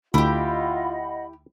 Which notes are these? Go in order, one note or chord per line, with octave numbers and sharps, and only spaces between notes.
D2 E4 F4 G4 D#5 F#5 B5